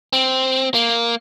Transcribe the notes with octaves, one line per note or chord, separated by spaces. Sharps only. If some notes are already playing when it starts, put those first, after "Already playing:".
C4
A#3